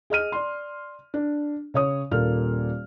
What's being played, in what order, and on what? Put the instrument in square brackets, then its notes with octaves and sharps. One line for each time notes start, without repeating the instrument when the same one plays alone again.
[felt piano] G#4 D#5 F6 D#7
D5 C6
D4
C#3 C#5 D#6
D#1 A#2 A#3 A4 F6